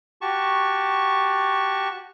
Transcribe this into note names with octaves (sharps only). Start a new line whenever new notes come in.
F#4 G4 A5 C#6